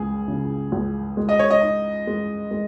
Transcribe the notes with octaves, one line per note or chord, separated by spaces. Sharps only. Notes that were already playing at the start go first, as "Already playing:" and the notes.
Already playing: C#2 G#4
C#3
C#2
G#3
D#5
C#5
D#5
D#4
G#3
G#3